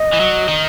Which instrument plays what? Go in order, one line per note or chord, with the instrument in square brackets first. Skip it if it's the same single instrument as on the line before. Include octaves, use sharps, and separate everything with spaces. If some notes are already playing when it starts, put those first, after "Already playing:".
Already playing: [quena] D#5
[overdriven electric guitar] E3
F#3
D#3